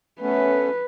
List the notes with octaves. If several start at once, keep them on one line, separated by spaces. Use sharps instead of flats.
A3 B3 C#4 B4